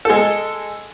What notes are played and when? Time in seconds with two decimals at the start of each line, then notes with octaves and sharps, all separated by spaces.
0.05 G#3 A4